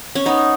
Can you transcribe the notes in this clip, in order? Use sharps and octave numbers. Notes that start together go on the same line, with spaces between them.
C#4
B3 D#4